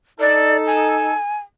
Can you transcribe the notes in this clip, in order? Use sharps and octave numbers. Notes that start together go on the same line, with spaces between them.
D#4 A4 D5
G#5